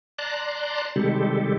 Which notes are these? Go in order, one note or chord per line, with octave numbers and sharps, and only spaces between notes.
D5 A5 A#5 C6 F#6
C3 D#3 G3 G#3 G4 A4